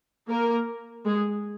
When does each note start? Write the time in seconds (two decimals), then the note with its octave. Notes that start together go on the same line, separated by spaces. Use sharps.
0.29 A#3 A#4
1.05 G#3 G#4